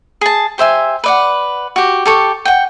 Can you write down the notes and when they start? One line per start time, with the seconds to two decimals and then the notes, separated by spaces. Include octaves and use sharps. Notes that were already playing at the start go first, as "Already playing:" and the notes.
0.21 G#4 A5
0.58 G4 C5 E5 G#5
1.04 B4 D5 F#5
1.76 F#4 G4
2.06 G4 A4 C#6
2.45 F#5 G5